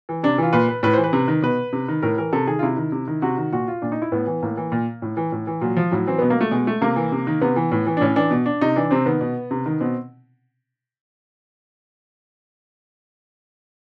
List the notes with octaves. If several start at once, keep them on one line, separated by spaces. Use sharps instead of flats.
E3
C3 D4
E3 F4
A#2 B4
B4
A2 B4
E3 C5
B4
C3
D#3
B2 B4
C3
D#3
A2 A#4
E3 A#4
C3 A4
D#3 G#4
F4
C3 E4
D#3
C3
D#3
C3 F#4
D#3
A#2 F#4
F4
A#2 D4
D#4
E4
A2 B3
E3
A2 A#3
E3
A#2
A2
E3
A2
E3
A#2 F#3
F3
A2 F#3
E3 C4
B2 B3
A#3
A3
B2 G#3
A3
C3 A#3
E3
C3
D#3
C3 B3
E3
A2
E3
D4
A2 C#4
E3 D4
B2
D4
C3 D#4
E3 D4
C3 C4
D#3 B3
B2
C3
D#3
B2 C4